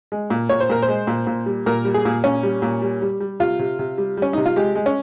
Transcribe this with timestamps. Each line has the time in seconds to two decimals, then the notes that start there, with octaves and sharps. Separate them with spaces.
0.12 G#3
0.30 A#2
0.49 A#2 C#5
0.60 C5
0.69 A#2 A#4
0.82 C5
0.88 G#3
1.07 A#2
1.27 A#2
1.46 G3
1.66 A#2 A#4
1.85 G3
1.94 G#4
2.05 A#2
2.24 A#2 C#4
2.43 G3
2.62 A#2
2.82 G3
3.02 G3
3.20 G3
3.40 C3 F4
3.59 C3
3.79 C3
3.98 G3
4.17 G3 C#4
4.33 C3 D#4
4.46 F4
4.56 G#3 G4
4.75 G#3
4.86 C#4